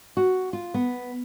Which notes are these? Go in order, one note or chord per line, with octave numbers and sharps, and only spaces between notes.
F#4
F4
B3